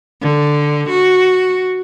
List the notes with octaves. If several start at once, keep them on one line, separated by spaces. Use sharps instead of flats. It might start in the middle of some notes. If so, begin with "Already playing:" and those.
D3
F#4